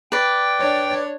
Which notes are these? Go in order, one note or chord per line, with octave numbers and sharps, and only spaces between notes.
B4 D5 G5
D4 C#5